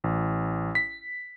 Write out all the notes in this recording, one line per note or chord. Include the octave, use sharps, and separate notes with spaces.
A1
B6